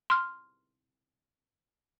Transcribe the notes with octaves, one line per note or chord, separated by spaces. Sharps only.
C6 F6